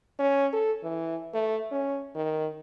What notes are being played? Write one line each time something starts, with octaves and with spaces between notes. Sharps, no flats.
C#4
A4
E3
A3
C#4
D#3